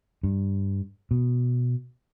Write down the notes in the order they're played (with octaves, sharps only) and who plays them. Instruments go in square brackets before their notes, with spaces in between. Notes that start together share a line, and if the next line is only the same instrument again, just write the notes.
[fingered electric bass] G2
B2